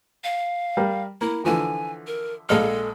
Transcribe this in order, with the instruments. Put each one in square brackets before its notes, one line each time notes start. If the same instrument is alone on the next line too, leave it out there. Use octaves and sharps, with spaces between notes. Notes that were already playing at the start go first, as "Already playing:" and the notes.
[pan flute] F5
[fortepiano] G3 A#4
[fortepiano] A#3 [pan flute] E4
[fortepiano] D3 E3 F3 [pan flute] G#5
[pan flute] A#4
[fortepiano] A#1 G#3 F6 [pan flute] A4